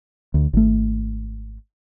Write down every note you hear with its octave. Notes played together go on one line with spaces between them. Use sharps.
D2
G#1 A3